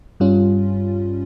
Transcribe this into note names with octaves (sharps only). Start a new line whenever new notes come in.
G2 G3 C#4 F4